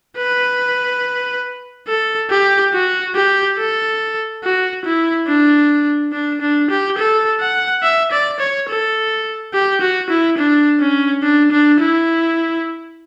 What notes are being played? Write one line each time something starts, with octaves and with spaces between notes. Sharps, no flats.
B4
A4
G4
F#4
G4
A4
F#4
E4
D4
D4
D4
G4
A4
F#5
E5
D5
C#5
A4
G4
F#4
E4
D4
C#4
D4
D4
E4